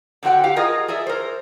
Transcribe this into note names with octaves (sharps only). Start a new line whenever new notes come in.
D3 C4 F#4 F#5 G5
G4 F5
F4 G#4 A#4 D#5
G#4 A#4 D5 E5
A#4 C5